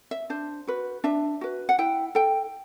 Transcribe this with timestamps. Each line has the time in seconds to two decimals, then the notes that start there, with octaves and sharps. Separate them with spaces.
0.11 E5
0.30 D4 C5
0.67 F#4 B4
1.04 D4 E5
1.41 F#4 B4
1.69 F#5
1.79 E4 G5
2.15 A4 G5